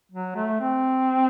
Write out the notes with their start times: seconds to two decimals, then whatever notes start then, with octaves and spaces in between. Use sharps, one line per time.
0.12 F#3
0.36 A3
0.60 C4